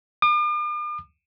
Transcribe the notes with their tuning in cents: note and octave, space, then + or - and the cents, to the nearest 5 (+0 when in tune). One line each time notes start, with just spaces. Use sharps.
D6 +45